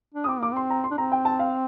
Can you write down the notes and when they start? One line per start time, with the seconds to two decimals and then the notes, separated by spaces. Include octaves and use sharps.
0.14 D4
0.24 D#6
0.27 C4 D6
0.40 A#3 D6
0.53 C4 C6
0.70 A#5
0.84 C6
0.91 D4
0.98 C4 A#5
1.12 G5
1.25 A5
1.39 F5